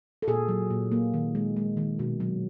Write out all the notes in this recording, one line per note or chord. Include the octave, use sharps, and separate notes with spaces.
A4
A#2 G#4
F#3
A#2
A#3
D#3
G#3
G#3
D#3
B2
F#3